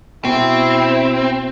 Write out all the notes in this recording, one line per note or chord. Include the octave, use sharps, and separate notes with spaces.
B2 C4 E4